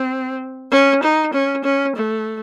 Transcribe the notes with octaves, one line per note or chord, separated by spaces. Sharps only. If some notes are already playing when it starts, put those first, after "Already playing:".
Already playing: C4
C#4
D#4
C#4
C#4
A3